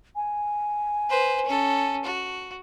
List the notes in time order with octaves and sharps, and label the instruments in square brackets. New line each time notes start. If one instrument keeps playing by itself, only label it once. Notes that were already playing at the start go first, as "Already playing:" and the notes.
[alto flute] G#5
[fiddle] B4 C5
C#4 A4
F#4